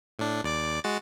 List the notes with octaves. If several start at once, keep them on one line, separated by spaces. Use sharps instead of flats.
A2 D4
D#2 D5 D6
G#3 F#4 A6